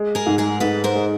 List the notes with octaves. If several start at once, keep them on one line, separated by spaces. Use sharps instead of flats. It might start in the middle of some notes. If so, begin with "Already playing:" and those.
Already playing: G#3
G#4 A#4
G#2
G#4 A#4
G#2 A4 B4
A#4 C5
G#3